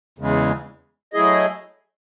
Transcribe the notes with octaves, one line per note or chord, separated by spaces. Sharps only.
E2 C#3 G#3
F#3 A3 E4 G#4 D#5